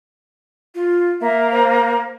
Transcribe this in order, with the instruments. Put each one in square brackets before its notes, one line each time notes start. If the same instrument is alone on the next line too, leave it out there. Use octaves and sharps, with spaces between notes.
[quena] F4
[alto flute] A#3 [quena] E5
[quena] C5